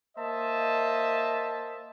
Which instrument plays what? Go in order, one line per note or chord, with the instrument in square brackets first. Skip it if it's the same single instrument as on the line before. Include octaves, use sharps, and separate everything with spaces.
[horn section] A#3 C5 D#5 E5 A5